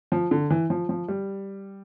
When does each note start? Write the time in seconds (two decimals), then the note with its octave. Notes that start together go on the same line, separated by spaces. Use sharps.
0.12 F3
0.31 D3
0.50 E3
0.70 F3
0.89 F3
1.08 G3